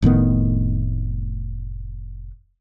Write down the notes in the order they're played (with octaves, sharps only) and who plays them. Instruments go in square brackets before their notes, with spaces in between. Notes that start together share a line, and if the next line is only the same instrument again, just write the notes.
[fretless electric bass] F1 A2 D#3 B3